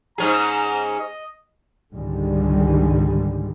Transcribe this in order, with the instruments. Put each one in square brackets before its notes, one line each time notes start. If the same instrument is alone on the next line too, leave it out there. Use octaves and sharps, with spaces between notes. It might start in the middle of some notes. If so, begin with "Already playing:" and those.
[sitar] G#2 C#4 G#4 [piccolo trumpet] A#5
[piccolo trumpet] D#5
[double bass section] C#2 G#2 D3 D#3 G3 G#3